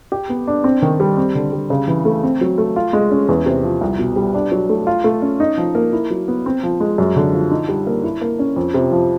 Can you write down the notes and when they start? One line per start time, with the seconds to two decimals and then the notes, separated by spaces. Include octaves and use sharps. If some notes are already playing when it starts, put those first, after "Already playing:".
0.12 G4
0.29 B3
0.48 D4
0.64 C4
0.82 D#3
1.00 G3
1.17 C4
1.35 D3
1.53 G3
1.70 C#3
1.88 E3
2.05 A3
2.23 C4
2.41 F#3
2.58 A3
2.76 F4
2.93 G#3
3.11 C#4
3.28 E2
3.46 C3
3.64 F3
3.81 C2
3.99 B2
4.16 G3
4.34 D4
4.52 F#3
4.69 A3
4.87 F4
5.04 A3
5.22 C#4
5.40 D#4
5.57 F3
5.75 A#3
5.93 E4
6.10 F#3
6.28 B3
6.46 C4
6.63 F3
6.80 G#3
6.98 F#2
7.16 D3
7.33 F3
7.51 D#4
7.69 G3
7.87 A#3
8.04 E4
8.21 A#3
8.39 C#4
8.56 F2
8.74 C3
8.92 F3